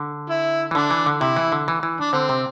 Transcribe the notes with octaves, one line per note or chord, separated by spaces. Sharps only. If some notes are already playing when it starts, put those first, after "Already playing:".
Already playing: D3
E4
E3
D3 D4
E3
D3
C3 E4
E3
D3
E3
E3
D4
D3 C4
C3